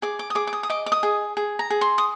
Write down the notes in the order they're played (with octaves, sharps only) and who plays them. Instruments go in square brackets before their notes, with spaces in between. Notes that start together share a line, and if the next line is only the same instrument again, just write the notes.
[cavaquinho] G#4 D6
D6
D#6
G#4 D6
D6
D#6
D#6
D#5 D6
D6
D#6
G#4
G#4
A#5
G#4
C6
D#6